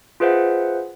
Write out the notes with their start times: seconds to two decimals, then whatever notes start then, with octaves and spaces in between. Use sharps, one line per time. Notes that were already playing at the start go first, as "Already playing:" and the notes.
0.20 F4 G#4 B4 C5 E5 F#5